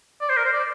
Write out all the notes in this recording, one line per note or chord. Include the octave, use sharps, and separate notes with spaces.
D5
C5
A#4
C5
D5